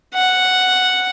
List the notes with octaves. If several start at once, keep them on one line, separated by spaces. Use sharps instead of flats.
F#5